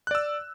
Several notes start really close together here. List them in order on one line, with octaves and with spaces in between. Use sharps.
F#6 D5 E6